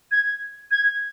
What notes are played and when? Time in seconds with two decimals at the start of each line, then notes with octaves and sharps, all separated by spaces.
0.11 G#6
0.71 G#6